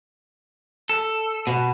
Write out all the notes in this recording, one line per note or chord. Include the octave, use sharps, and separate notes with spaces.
A4
B2